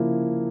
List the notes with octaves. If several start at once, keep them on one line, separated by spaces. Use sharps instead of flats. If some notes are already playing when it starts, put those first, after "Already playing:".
Already playing: C#3 F3 A#3 E4